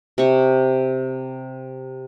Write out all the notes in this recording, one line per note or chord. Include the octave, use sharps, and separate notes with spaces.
C3 C#6